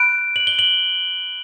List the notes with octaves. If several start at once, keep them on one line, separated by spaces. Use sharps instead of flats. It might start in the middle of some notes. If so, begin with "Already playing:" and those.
Already playing: B5 F#6 D7
F#7
G7
F#7